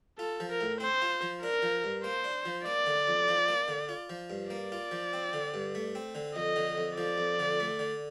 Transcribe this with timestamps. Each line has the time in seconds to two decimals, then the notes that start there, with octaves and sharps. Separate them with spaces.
0.19 F4 A4
0.40 F3
0.50 A#4
0.61 A2
0.80 C4 C5
1.02 F4
1.22 F3
1.42 D4 A#4
1.62 F3
1.84 G2
2.04 A#3 C5
2.24 D4
2.45 F3
2.65 A#3 D5
2.86 D3
3.08 F2
3.28 F3
3.48 A#3
3.68 D3
3.89 F4
4.10 F3
4.30 G2
4.50 A#3 D5
4.72 F4
4.91 F3
5.13 C4
5.33 D3
5.54 G2
5.75 A3
5.95 C4
6.15 D3
6.36 F2 D#5
6.56 D3
6.78 F2
6.98 F3 D5
7.18 F2
7.39 D3
7.60 A3
7.79 D3